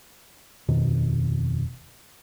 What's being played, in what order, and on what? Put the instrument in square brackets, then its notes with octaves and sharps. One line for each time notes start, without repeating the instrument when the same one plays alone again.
[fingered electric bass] D#1 F2 B2 D#3